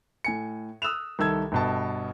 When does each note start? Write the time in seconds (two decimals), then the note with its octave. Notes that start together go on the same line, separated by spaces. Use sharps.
0.24 A2 G#5 C#7
0.82 D#6 E6 F#6 E7 F7
1.19 C2 D#3 A4 E6 G#6
1.52 G1 B2 A5